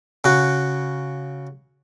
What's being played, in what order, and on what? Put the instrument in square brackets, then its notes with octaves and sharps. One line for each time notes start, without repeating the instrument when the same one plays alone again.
[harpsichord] C#3 F#4